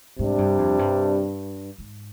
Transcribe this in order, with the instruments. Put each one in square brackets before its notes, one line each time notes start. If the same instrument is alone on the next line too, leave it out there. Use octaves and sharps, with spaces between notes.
[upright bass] G#2 [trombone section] C3 G3 D4
[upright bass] G2
F2
G2
G#2